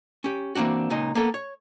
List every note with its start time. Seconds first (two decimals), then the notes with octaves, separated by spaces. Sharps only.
0.24 C#4 G4
0.55 E3 A#3 C4 D4 F#4
0.90 C#2 A#2 D#4 D#5
1.15 A#3 B3 A4
1.34 C#5